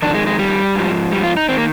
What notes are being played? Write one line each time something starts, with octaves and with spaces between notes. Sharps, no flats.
F2 D#3 D4
G#3
G#3
G3
G#2 F3
G3
F4
D#4
D#3 C4
A#3